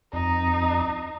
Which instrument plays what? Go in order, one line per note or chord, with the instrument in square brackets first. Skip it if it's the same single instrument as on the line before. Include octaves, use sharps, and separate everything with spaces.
[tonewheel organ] F2 [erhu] D#4